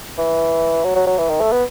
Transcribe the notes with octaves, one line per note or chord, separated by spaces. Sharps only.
E3
F#3
F#3
F#3
E3
D#3
A3
B3